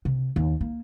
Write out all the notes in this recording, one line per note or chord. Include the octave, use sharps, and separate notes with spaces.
C3
D#2
A#3